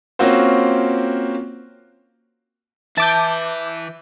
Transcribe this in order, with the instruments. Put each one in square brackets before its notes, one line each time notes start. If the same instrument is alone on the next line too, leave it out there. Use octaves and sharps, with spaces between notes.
[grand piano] A#3 C4 C#4 F4 F#4 C5
[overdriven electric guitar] E3 E4 [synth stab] A5 D6 G6